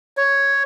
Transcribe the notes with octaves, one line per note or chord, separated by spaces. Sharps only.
C#5